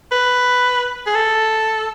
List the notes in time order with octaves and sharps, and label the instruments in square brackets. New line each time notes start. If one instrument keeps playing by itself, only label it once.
[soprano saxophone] B4
G#4
A4